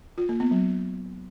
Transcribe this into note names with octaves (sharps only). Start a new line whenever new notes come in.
F4
A#3
B3
F#3